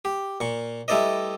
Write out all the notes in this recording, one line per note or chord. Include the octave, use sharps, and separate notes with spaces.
G4
A#2 C#6
G3 A3 E4 B4 D5 D#5